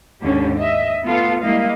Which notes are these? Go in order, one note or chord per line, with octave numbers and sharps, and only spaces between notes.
D#2 G#2 D3 C#4 G4
D#5 E5
A3 B3 F4 A4 F5
G3 G#3 A#3 E4 D#5 F5